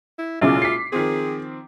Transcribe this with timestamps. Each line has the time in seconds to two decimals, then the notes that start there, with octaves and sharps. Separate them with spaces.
0.19 E4
0.41 B1 A#2 C#3 G#3 E4 F4 D6
0.62 B6 C7
0.92 D#3 F3 C4 G#4